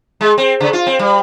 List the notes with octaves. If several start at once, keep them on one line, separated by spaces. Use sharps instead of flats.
G#3
C4
C#3
F4
C4
G3